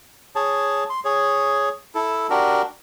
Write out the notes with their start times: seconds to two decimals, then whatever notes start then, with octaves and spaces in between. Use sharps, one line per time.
0.35 G#4 C#5 A5
0.90 C6
1.05 G#4 C#5
1.95 E4 A4
2.30 D4 F#4 G4 A#4